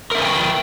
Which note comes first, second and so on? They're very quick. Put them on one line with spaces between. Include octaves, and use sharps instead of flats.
A#4 E5 B4 G#5 G5